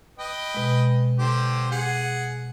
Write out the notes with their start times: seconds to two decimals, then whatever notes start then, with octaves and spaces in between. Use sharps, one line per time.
0.19 B4 D#5 G5
0.54 B2 G#3
1.19 D3 G4 C5
1.71 G#4 F#5